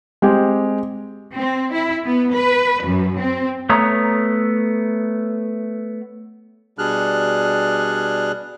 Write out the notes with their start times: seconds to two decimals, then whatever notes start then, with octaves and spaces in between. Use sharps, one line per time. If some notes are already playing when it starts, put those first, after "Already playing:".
0.22 G#3 C4 G4 G#4
1.35 C4
1.73 E4
2.05 B3
2.35 B4
2.85 F#2
3.19 C4
3.70 A3 B3 C#5 A#5 D#6
6.79 B2 G3 D4 G#4 F6 F#6